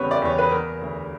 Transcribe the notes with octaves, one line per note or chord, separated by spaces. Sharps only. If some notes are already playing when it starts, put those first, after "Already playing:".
Already playing: E2 C#3 G3 B3 G4 B4 C#5
D5
E2 C#5
B4
B3 A#4
D2